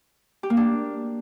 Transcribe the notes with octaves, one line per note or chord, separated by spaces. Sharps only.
G4
A#3
D4